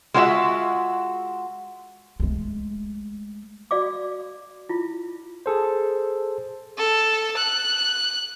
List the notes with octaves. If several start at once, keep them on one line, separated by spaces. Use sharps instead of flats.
G#3 F4 F#4 C5 E5 F#5
G#3 A3
F#4 D5 F5 D6
E4 F4
G#4 A4 C5
A4
F#6